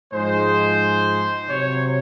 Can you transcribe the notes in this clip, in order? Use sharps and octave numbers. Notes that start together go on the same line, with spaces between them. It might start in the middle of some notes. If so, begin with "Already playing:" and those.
G#2 F3 G#3 C5
C3 F#3 C#5